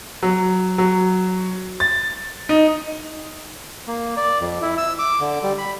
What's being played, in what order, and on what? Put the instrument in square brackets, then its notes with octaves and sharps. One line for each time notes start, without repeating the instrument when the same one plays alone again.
[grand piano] F#3
F#3
A6
D#4
[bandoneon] A#3
D5
F2
E4
E6
D6
D3
G3
B5